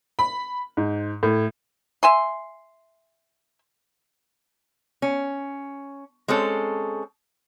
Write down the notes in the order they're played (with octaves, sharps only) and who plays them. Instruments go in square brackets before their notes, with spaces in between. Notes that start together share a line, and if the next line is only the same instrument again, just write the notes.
[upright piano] B5
G#2
A2
[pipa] E5 G#5 C6
[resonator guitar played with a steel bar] C#4
G#3 C4 C#4 A4